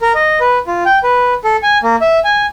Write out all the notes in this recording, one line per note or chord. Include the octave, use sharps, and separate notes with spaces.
A#4
D#5
B4
F4
G5
B4
A4
G#5
A#3
E5
G#5